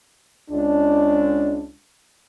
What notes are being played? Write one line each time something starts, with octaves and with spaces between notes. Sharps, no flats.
C#2 D4